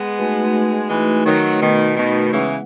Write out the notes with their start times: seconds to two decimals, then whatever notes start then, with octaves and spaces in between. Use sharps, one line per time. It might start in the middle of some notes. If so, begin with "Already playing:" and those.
Already playing: G#3 B3
0.19 A3 D#4 F#4 B4
0.90 E3 G#3 A3 D#4 F#4 B4
1.26 D#3 F#3
1.61 B2 D#3 A3 D#4 F#4 B4
1.97 B2 D#3
2.32 C#3 E3 G#3 B3 E4 B4 F#5